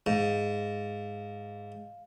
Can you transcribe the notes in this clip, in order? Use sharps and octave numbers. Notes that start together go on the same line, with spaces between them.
G#2 F5